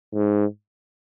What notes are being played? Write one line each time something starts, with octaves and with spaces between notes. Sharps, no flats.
G#2